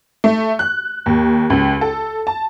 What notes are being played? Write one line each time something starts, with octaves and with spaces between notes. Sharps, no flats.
A3
F#6
D#2
C#2
A4
A5